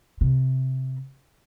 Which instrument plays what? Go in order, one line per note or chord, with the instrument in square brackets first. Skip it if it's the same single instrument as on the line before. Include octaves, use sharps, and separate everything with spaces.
[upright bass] C3